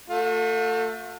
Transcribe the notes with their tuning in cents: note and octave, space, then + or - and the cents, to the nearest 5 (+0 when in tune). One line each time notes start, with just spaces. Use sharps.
A3 +25 F#4 -45